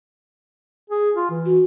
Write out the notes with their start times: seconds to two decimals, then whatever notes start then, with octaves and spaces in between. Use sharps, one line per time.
0.90 G#4
1.15 F4
1.31 E3
1.46 F#4